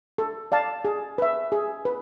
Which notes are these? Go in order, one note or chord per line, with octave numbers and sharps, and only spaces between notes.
A4
D5 F5 A5
G#4
B4 E5
G#4
B4